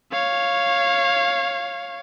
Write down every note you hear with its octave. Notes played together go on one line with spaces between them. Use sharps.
C#5 F5